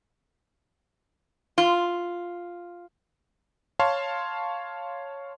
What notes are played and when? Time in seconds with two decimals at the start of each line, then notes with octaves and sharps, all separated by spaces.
1.58 F4
3.79 C#5 F5 A5 C6